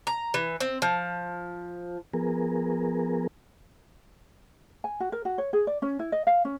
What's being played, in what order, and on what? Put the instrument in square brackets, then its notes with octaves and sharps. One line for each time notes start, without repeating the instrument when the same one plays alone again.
[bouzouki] A#5
E3
C4
F3
[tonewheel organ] F3 B3 G#4 A#4
[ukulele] G#5
F#4
A#4
F#4
C#5
G#4
D5
C#4
E4
D#5
F5
C#4